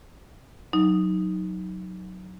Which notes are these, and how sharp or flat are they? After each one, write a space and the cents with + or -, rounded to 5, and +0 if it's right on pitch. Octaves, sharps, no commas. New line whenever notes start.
F#3 +0 D#4 +0